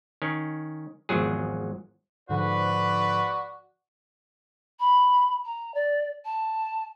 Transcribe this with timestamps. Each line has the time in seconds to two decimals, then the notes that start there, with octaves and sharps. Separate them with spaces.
0.22 D#3 C#4
1.09 G#1 E2 F3 F#3 G#4
2.29 G#2 D3 F3 F#4 B4 D5
4.80 B5
5.45 A#5
5.74 D5
6.25 A5